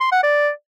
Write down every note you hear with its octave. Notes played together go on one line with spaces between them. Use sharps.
C6
F#5
D5